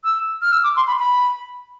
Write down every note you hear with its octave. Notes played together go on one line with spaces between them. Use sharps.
E6
F6
E6
D6
C6
B5
B5